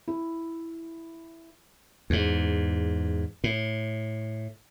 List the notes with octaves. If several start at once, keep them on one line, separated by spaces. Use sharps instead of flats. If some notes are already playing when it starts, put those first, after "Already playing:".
E4
E2 G#2
A2